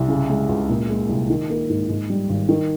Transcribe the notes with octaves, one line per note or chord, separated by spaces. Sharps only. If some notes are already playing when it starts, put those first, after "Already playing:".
Already playing: C2
C#3
G#3
C#2
A#2
G#3
C2
D#3
A#3
G#2
G#2
G3
G#1
D#3